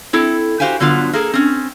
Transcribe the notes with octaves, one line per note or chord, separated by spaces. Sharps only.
C4 E4 A4
F#4 G4 C5 F5 G5 G#5
G2 D3 F#3 B3 F4
A#3 G#4 A4
C4 C#4